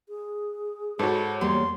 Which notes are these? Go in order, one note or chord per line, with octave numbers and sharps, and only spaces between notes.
G#4
G#2 F#4 A4 B4 C#5
E2 G3 A#3 C6